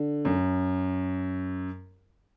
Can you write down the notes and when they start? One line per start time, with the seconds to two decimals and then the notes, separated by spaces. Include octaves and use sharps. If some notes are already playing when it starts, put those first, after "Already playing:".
Already playing: D3
0.25 F#2